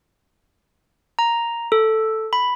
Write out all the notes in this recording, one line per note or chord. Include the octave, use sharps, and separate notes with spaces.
A#5
A4
B5